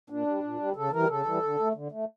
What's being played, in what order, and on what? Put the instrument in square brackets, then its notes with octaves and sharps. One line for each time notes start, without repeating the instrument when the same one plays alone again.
[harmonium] A#2 D4
G3
A#2
G3
C#3 A4
E3 G3 A#4
C#3 A4
E3 G3
D3
A3
D3
A3